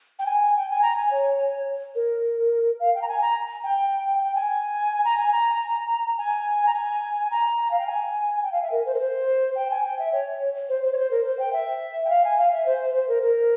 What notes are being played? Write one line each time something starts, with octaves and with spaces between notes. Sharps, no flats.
G5
G#5
G5
G#5
A#5
G#5
C#5
A#4
F5
G5
A#5
G#5
A#5
G5
G5
G#5
A#5
G#5
A#5
G#5
A#5
G#5
A#5
F5
G5
G#5
G5
F5
E5
A#4
C5
A#4
C5
G5
G#5
G5
E5
C#5
C5
C5
C#5
C5
A#4
C5
G5
E5
G5
F5
G#5
F5
E5
C5
C5
A#4
A#4